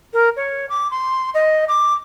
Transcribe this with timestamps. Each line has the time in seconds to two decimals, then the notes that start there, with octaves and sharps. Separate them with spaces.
0.13 A#4
0.36 C#5
0.69 D6
0.91 C6
1.34 D#5
1.68 D6